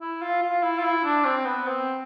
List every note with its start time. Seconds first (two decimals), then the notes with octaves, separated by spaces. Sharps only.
0.01 E4
0.22 F4
0.42 F4
0.62 E4
0.78 F4
0.84 E4
1.04 D4
1.25 C4
1.45 B3
1.66 C4